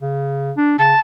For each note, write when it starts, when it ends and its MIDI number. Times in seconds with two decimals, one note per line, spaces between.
0.01 0.52 49
0.57 0.76 62
0.79 0.94 49
0.79 1.00 81